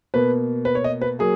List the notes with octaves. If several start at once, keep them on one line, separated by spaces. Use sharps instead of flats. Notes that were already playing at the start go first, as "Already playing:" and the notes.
B2 A#3 B4
B4
C#5
D#5
B4
F#3 A#3 G#4